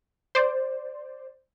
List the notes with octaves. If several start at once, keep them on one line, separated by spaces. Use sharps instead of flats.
C5 D5